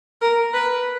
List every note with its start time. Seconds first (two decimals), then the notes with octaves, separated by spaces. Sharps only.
0.21 A#4
0.54 B4